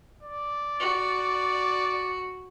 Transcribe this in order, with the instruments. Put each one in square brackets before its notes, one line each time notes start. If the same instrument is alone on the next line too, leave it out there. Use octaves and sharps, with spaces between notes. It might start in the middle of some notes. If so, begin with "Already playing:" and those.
[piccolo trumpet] D5
[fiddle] F#4